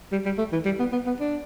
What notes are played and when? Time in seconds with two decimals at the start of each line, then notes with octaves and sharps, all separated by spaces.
0.12 G3
0.25 G3
0.38 A3
0.52 E3
0.65 G3
0.79 B3
0.92 B3
1.07 B3
1.20 D4